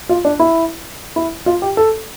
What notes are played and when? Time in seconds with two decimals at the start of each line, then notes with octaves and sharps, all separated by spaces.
0.09 F4
0.25 D4
0.40 E4
1.16 E4
1.46 F4
1.62 G4
1.77 A4